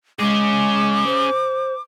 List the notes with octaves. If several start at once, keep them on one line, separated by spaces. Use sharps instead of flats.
G#3 C#4 G#4 D6
C5